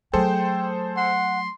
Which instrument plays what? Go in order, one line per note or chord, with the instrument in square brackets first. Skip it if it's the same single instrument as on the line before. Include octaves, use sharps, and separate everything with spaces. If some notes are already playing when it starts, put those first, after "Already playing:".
[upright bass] F#3 A3 [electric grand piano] G#4 A4 C5 [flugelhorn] G5
[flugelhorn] F#5 [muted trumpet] C6